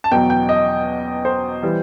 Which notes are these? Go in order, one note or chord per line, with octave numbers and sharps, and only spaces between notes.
A5
E2 B2 F#3 G5
G5
D#5
C5
E3 G3